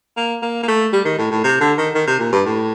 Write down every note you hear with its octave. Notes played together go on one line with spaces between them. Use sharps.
A#3
A#3
A#3
A3
G3
D#3
A2
A2
C3
D3
D#3
D#3
C3
A#2
G2
A2